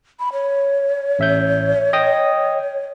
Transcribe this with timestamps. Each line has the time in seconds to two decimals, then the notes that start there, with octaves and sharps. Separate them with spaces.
0.20 B5
0.33 C#5
1.19 A1 E5 G6
1.93 D#5 G5 D#6